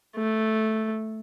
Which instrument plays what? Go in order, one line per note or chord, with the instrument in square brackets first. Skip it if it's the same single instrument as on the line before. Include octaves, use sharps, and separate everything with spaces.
[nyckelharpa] A3